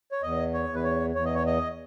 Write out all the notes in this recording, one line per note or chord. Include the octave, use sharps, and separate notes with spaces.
C#5
E2 D#5
C#5
E2
B4
C#5
E2 C#5
D#5
C#5
D#5